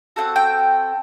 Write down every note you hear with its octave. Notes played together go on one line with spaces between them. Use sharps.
C4 D#4 F#4 A4 F#5
G5